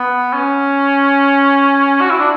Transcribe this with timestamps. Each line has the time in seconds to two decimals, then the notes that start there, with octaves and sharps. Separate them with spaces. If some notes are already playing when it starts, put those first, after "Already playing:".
Already playing: B3
0.33 C#4
2.01 F#4
2.11 E4
2.20 D4